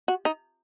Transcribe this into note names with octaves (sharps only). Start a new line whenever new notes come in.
F#4
D#4